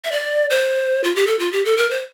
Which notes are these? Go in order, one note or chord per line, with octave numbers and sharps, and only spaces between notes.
E5
D5
C5
F4
G4
A4
F4
G4
A4
A#4
C5